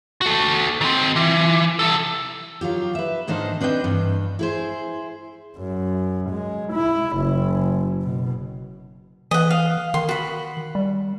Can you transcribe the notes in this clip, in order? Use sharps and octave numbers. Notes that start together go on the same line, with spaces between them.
F#4 A4
D#3 C4
E3
C2 A4
D#3 F#3 F4 G4
B4 E5
G#2 D#3 A#3 D4 D#4 C5
C4 D4 B4 D#5 G5
G2 E3
E4 G#4 C5
F#2
G#3
E4
F#1
B2
E3 D#5 F#5
F5
D#3 C6
F#4 B5
G3